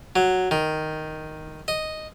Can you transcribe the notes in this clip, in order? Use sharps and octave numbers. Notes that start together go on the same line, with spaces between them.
F#3
D#3
D#5